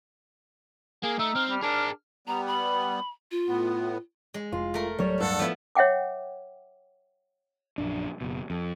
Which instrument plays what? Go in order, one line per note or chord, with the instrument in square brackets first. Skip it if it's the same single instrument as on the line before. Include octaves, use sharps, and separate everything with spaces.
[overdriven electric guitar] A#3 [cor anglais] G#4
[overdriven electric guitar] A3 [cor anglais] D#4 [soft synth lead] E6
[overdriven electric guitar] C4 [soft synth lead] F6
[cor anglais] G3
[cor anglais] D4 [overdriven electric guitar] G#4 A#4
[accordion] G3 B3 [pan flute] A#5
[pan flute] B5
F4
[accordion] A2 B3
[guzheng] G#3
[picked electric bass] F1 [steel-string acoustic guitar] F4
[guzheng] A3 A#4
[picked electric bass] D1 F#3 [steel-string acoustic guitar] G3 C#5
[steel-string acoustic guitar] G2 [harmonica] A4 F#5
[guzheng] F3 B3 E4
[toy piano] C#5 E5 F#5 G5 D6
[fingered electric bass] A#1 F#2 D4
F#1 B2
F2